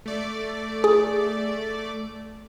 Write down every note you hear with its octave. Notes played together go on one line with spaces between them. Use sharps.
A3 D5
G#4